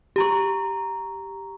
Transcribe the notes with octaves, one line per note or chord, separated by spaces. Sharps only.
G4 A#5 C#6